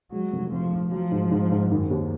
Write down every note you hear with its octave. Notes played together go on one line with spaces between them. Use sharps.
F#3 G#3
F1
F2 F3
F1
F3 F#3
G#2
G#2
G#2
F#2 D#3
D#2